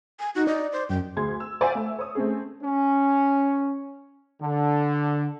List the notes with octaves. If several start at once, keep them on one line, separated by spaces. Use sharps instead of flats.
G#5
D#4 F#4
D#4 D5
C5
F#2 G5
D2 G#4 C6 G#6
E6
F4 C5 D5 E5 F#5 G#5
A3 A4 E5 E6
C#5 D#6
A3 C4 C#4 G#4
C#4
D3